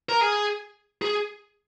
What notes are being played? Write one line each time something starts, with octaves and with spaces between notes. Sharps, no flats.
A#4
G#4
G#4